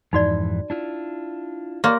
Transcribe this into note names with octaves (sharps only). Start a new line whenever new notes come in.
F2 G#2 E3 D#4 F#4 D5
D4 E4 F4
A#3 G4 C#5 D5 C6